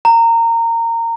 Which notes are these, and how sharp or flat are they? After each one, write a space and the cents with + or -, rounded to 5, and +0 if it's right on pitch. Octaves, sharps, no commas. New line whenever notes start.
A#5 -20